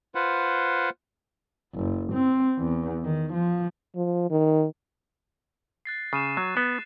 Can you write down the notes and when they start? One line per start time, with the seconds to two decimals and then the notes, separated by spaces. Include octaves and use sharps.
0.15 F4 B4 C5 F#5
1.75 F#1
2.13 C4
2.58 E2
3.04 D#3
3.34 F3
3.95 F3
4.30 D#3
5.85 F#6 A6 C7
6.13 C#3 C7 D#7 E7
6.37 F#3 F#6
6.57 B3 E7